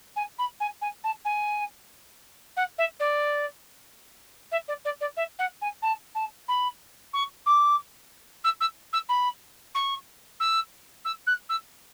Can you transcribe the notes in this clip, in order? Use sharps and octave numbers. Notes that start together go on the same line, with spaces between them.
G#5
B5
G#5
G#5
A5
G#5
F#5
E5
D5
E5
D5
D5
D5
E5
F#5
G#5
A5
A5
B5
C#6
D6
E6
E6
E6
B5
C#6
E6
E6
F#6
E6